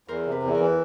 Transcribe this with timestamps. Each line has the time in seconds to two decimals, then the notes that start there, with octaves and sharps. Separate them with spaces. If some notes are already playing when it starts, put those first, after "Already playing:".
0.08 E2 A#4 C5
0.26 C3
0.32 B4
0.43 E2
0.55 A#4
0.60 E3